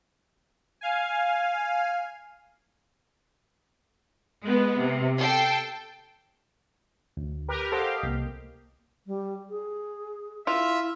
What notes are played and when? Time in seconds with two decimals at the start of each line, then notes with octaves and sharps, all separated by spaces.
0.81 F5 G#5
4.43 G#3 B3
4.77 C3
5.20 A4 G5 C7
7.17 D2
7.48 G4 A#4 B4
7.72 G4 A4 C5 D#5 F5 F#5
8.03 C2 A#3
9.07 G3
9.50 G#4
10.47 E4 F4 E5